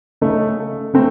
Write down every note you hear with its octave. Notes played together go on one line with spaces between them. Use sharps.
C#3 A3 D#4
C#3 A3 C4